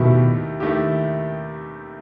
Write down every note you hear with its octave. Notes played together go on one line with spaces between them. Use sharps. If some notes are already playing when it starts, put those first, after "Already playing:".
Already playing: D#2 B2 D#3 A3 E4 G4
D#2 D#3 A3 E4 G4